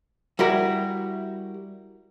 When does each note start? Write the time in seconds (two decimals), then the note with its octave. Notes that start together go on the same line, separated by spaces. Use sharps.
0.39 G3 E4 F#4 A#4